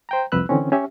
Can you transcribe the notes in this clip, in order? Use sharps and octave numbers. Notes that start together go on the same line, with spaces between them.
C5 G5 A#5
C2 F2 B4 E6 F#6
D3 E3 C4 C#4
C#4 G4 E5